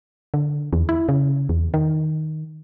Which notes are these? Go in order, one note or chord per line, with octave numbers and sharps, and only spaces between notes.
D3
E2
E4
C#3
E2
D#3